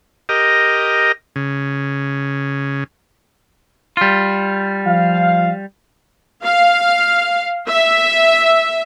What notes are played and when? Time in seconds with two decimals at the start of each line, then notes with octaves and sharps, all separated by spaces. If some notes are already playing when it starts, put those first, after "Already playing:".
0.29 G4 A#4 D#5
1.36 C#3
3.97 G3 F4
4.86 F3 F5
6.43 F5
7.68 E5